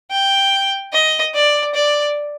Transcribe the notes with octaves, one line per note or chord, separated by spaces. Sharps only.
G5
D#5
D5
D5